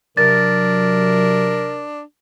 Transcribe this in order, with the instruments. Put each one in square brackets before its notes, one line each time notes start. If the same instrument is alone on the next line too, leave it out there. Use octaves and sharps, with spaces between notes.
[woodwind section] C3 A#4 [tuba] F#3 [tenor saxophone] D4 [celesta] A6